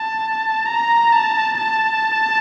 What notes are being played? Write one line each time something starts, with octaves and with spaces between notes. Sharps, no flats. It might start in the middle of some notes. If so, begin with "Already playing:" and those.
Already playing: A5
A#5
A5
A5